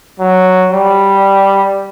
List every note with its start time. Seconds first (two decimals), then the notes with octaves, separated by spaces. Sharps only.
0.20 F#3
0.71 G3